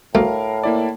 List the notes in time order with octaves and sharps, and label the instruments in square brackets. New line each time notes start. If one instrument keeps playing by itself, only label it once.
[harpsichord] D2 A3 [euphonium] A2 [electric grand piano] A#4 F5
[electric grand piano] A#3 E4 D5